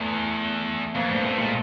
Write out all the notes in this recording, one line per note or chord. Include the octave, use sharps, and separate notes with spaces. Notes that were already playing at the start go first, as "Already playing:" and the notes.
Already playing: E2 A3 B3
F2 A#3 C4
G2 A3 B3
A2 A3 B3
A#2 G#3 A#3